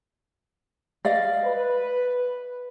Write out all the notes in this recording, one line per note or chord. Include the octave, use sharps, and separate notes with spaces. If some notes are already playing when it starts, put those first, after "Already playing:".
D5 D#5 F5
B4